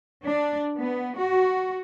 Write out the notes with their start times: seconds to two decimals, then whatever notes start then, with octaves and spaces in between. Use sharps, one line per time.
0.24 D4
0.79 B3
1.19 F#4